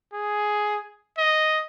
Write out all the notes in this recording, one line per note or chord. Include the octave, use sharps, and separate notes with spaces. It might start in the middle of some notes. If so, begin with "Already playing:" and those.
G#4
D#5